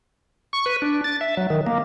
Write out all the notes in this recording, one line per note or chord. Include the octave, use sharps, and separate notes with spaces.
C#6
B4
D4
A6
E5
F#3
D#3
A#3